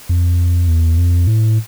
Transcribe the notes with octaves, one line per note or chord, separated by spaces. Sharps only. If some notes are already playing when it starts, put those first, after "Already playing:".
F2
E2
F2
A2